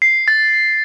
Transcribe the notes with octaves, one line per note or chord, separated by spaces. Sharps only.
C7
A6